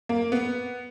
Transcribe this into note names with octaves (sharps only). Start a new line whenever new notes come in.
A#3
B3